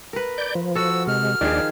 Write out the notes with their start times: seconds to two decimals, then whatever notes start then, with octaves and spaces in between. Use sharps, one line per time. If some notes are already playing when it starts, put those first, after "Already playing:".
0.13 A#4 B4
0.38 D5 G6
0.55 F3
0.75 F#4 A4 E6
1.07 C3 G#3 F6
1.41 D#2 D#3 F3 D4 G#4 D5